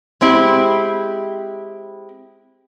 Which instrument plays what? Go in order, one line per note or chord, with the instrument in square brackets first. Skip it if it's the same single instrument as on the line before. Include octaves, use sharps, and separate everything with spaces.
[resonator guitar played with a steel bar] G#3 C4 E4 G4